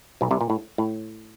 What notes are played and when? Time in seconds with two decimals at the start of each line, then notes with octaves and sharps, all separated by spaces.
0.21 B1 B2
0.31 C2 C3
0.41 A#2
0.50 A2
0.78 A2